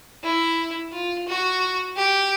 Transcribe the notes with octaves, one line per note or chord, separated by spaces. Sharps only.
E4
F4
F#4
G4